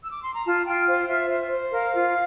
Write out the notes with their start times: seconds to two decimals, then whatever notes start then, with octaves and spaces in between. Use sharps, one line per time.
0.03 E6
0.13 D6
0.24 C6
0.35 A#5
0.45 F4 A5
0.66 F4 G5
0.87 C5 F5
1.08 F4 E5
1.30 C5 E5
1.51 C5
1.72 A#4 F5
1.94 F4